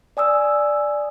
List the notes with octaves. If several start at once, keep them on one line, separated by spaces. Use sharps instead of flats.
D5 G#5 D#6 E6